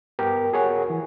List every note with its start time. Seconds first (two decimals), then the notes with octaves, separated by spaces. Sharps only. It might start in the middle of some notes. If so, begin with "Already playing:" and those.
0.19 G2 B3 G4 A#4
0.53 F#4 G#4 A#4 C#5 F#5 G#5
0.90 E3